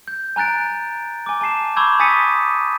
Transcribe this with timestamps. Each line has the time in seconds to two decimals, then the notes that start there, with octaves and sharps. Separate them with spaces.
0.08 G6
0.36 G#5 A#5 F#6 A6 D7
1.26 G#5 D6
1.41 G#5 A5 C7 E7
1.76 B5 C#6 D6 E6 G6 G#6
1.99 G#5 D#6 A6 B6 C#7 D#7